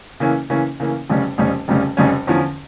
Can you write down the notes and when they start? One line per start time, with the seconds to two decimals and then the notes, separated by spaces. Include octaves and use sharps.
0.20 C#3 E3 A#3 C#4
0.50 C#3 E3 A#3 C#4
0.80 C#3 E3 A#3 C#4
1.09 F1 F2 C#3 G3 C#4
1.38 F1 F2 C#3 G3 C#4
1.68 F1 F2 C#3 G3 C#4
1.97 F1 F2 C#3 G3 C#4
2.27 E2 D3 F3 C#4